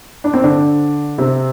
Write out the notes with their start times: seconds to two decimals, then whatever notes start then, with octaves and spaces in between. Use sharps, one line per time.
0.24 D4
0.34 C4
0.44 D3 D4
1.18 C3 C4